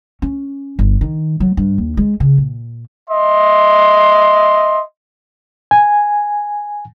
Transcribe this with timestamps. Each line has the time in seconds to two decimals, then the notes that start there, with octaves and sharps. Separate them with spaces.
0.22 C#4
0.79 G1
1.01 D#3
1.40 F#3
1.57 G2
1.78 D#2
1.97 G#3
2.20 C#3
2.38 A#2
3.10 D#5 E5 C6
5.71 G#5